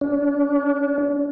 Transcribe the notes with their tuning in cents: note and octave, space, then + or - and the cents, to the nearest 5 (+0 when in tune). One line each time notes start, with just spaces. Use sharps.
D4 -45